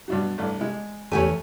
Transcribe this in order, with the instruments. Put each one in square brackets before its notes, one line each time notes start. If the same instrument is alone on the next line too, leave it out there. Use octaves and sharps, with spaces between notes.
[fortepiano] G2 B2 F#3
A1 G2
G#3
[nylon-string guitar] E2 G2 G#5 [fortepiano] A3 G4 C#5